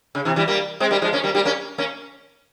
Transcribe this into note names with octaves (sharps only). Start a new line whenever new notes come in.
C#3
C3 E3
E3 G3
G3 A#3
G#3 C4
G3 A#3
F3 G#3
A#3 C#4
G3 A#3
G3 A#3
A#3 C#4
A#3 C#4